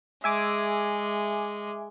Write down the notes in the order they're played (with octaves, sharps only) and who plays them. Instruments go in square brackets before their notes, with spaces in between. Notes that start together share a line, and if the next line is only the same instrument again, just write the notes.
[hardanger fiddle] G#3 [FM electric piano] E5 G#5 D6